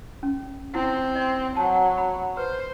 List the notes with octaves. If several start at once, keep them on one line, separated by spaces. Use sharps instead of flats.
C#4
C4 E4
D#5
F#3 F#5 A5
B5
B4 C5